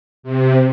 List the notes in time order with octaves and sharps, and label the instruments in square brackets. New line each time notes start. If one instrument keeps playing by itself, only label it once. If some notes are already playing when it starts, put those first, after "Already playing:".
[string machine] C3